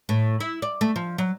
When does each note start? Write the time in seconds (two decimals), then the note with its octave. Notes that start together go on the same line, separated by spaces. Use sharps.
0.09 A2
0.40 E4
0.62 D5
0.81 A3
0.96 F3
1.18 F#3